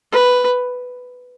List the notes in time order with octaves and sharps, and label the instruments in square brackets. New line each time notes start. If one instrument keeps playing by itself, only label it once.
[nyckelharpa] B4